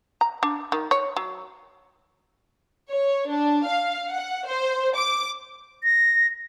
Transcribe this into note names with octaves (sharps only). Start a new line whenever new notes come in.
A#5
D4
D#3
C#5
F#3
C#5
D4
F5
F#5
C5
D6
A#6